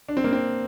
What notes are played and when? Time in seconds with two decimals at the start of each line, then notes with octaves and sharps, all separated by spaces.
0.08 D4
0.17 C4
0.24 A#3
0.33 C4